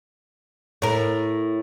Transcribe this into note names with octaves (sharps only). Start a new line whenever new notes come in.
A2 A#4